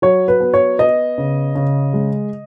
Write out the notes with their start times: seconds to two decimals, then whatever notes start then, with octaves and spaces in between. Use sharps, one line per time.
0.02 F#3 C#5
0.28 B4
0.40 B3
0.54 C#5
0.79 B3 D#5
1.18 C#3
1.55 C#3
1.93 G#3